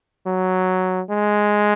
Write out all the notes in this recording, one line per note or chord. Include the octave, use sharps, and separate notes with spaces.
F#3
G#3